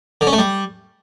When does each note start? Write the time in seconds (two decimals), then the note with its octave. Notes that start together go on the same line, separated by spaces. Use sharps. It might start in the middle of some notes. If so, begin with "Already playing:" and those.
0.21 D3
0.27 C#4
0.33 A3
0.38 G3